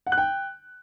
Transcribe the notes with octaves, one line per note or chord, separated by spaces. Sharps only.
F#5
F#6
G5